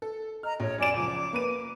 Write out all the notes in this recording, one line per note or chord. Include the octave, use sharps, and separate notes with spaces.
A4
D#5 A#5 F6
A#1 C#5
F#2 D5 G#5 D6 E7
C#2 F3 D6
A#3 B4 D#7